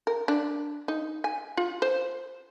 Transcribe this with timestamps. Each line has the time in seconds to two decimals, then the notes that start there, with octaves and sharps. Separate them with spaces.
0.07 A#4
0.28 D4
0.88 D#4
1.24 G#5
1.57 F4
1.82 C5